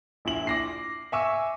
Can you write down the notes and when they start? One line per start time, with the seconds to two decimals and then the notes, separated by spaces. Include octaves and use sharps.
0.25 A#1 E4 F#7
0.47 D6 A#6 C7
1.12 E5 G#5 C#6 D6 E6